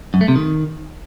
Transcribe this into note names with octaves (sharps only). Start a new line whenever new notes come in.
F#2
A3
C3
D#3